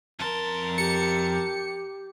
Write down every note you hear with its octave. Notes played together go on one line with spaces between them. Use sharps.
F2 A#4 A5 C6
G4 C#7